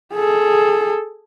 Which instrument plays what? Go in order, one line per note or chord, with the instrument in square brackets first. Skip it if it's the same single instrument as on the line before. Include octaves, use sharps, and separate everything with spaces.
[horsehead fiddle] G#4 A4